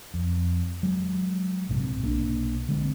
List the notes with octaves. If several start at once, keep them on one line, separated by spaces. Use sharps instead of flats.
F2
F#3 G#3
A#1 G#2 C3
B1 A#3 D4
D3 G#3 C4